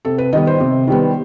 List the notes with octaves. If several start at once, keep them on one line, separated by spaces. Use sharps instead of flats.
C3 A4
B4
D#3 G3 B3 D#5
C5
C3
D#3 G3 B3